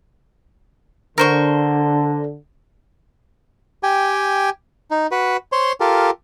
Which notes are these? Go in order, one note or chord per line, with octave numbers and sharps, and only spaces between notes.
D3 A#4 C5 C#6
G4 G5 G#5
D#4
F#4 B4
C5 C#5 C6
F4 G4 A4 A#4